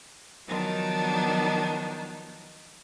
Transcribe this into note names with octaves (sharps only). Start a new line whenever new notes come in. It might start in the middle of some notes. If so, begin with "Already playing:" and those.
D#3 F3 F#3 B3 D4 D#4